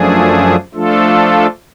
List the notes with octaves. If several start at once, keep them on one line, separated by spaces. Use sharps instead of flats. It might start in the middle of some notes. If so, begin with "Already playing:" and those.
Already playing: F#2 F3 A3 D4 G#4
F3 A3 D4 F4 A4